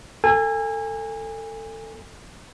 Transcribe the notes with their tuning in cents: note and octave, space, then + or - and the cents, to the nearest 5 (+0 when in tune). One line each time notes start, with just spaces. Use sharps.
A4 +20 G#5 -30